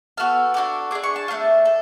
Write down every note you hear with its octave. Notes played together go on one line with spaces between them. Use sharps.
B3 F#4 A4 F6
D4 F#4 A4 D6
D4 G#4 D6
C#6
A5
A3 D4 F4
A4